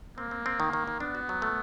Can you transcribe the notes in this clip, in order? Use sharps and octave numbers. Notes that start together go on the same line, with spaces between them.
A#3 C4
C4
C4
D#3
D#3
D#3
B3 D4
F#4
F#3
A3